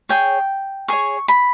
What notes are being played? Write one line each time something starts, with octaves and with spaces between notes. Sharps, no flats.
G#4 C#5 G5
G#4 C#5 C#6
B5